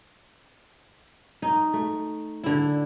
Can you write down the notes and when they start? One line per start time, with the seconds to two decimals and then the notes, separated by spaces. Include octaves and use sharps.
1.42 D#4
1.73 A3
2.43 D3 E4